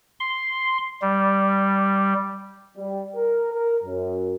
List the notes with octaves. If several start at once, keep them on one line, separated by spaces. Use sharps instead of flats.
C6
G3
G3
A#4
A#4
F#2